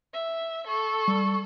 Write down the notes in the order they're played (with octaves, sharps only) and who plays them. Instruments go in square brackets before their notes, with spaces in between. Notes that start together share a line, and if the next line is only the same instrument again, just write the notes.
[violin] E5
[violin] A4 [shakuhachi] C#6
[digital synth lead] G3